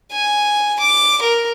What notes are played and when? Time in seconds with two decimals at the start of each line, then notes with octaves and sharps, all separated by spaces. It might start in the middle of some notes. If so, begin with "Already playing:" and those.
0.12 G#5
0.79 D6
1.22 A#4